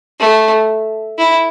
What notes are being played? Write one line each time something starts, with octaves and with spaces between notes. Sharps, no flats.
A3
E4